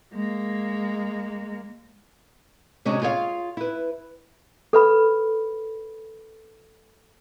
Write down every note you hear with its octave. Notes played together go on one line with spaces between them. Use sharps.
G#3 A#3
C3 G#3 C#4 D4 F#4 G#4
F4 G#4 C#5 D5 F5
E4 B4
A4 B4 B5